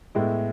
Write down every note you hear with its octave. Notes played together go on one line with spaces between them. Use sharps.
A2 G#3 B3 E4